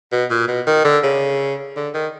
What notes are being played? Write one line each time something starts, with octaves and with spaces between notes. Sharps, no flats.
B2
A#2
B2
D#3
D3
C#3
D3
D#3